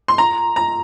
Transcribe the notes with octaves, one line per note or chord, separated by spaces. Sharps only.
C6
A#5
A#5